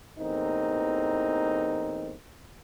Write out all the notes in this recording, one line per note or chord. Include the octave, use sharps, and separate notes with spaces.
A1 E2 A#3 C4 D#4